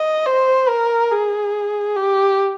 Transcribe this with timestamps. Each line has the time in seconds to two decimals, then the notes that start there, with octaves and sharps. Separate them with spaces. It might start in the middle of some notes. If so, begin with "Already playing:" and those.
Already playing: D#5
0.26 C5
0.68 A#4
1.11 G#4
1.96 G4